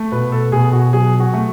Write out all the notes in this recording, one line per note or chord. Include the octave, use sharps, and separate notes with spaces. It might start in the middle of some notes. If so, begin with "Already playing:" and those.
Already playing: A3
B2 B4
A4
B2 G#4
F#4
F#3 G#4
F#4
A3